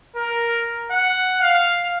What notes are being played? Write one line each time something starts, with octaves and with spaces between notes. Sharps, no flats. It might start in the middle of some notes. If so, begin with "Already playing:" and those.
A#4
F#5
F5